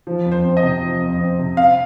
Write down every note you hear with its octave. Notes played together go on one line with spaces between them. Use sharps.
F3
F2
C5
C4
D#5
C3
F3
F2
C4
C3
C4 F5